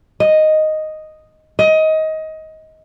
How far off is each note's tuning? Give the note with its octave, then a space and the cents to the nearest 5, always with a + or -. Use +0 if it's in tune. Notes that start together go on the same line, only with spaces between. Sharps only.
D#5 +0
D#5 +20